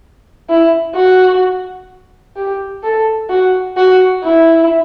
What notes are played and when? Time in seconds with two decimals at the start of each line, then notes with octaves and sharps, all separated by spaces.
0.49 E4
0.95 F#4
2.36 G4
2.83 A4
3.30 F#4
3.77 F#4
4.24 E4